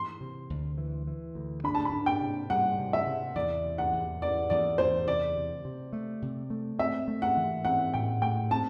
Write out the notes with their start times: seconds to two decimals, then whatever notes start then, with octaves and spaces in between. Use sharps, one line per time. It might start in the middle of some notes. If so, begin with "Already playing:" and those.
Already playing: E3 C6
0.21 C3
0.50 D2
0.78 E3
1.07 E3
1.35 D2
1.64 D4 B5
1.75 A5
1.85 B5
1.92 D4
2.06 G5
2.21 C3
2.50 G3 F#5
2.78 C3
2.93 E5
3.07 C3
3.35 E2 D5
3.64 C3
3.78 F#5
3.93 E2
4.22 E3 D5
4.50 E2 D5
4.78 E2 C5
5.07 C3 D5
5.37 C3
5.65 C3
5.93 A3
6.22 C3
6.50 A3
6.79 C4 E5
7.08 A3
7.22 F#5
7.37 E3
7.65 C4 F#5
7.94 A2 G5
8.22 A3 G5
8.50 C4 A5